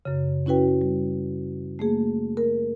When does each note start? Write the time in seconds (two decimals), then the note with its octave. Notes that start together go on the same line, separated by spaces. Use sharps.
0.05 F#2 C#3
0.46 C#4 E4 F#4 B4 G5
0.81 G3
1.79 A3 A#3 G#4
2.37 A#4